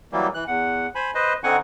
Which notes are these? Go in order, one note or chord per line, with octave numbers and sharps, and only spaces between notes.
E3 F#3 G3 A#3
E3 F#6
E2 F#5
C5 G#5 B5
B4 C5 D#5
D3 C4 D#4 F#5 G#5 C#6